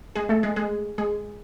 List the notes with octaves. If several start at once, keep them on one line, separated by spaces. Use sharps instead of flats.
G#3 G#4
A3 A4
G#3 G#4
G#3 G#4
G#3 G#4